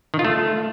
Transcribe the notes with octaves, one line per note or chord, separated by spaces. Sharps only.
D#3
F4
A3